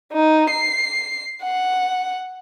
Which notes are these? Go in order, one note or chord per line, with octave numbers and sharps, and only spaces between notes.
D#4
C7
F#5